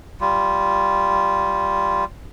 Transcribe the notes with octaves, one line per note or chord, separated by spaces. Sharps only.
G3 F4